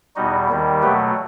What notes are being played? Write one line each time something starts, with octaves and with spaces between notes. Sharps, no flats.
E2 B2 G3 D#4 F#4
D#2 D#3 G3
B2 F#3 A3 G4 B4